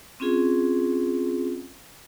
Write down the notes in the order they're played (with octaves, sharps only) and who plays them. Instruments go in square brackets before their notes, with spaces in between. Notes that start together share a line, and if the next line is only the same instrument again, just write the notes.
[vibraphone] C4 C#4 F4 G#4